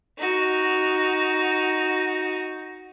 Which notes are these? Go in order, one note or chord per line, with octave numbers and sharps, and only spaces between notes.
D#4 F#4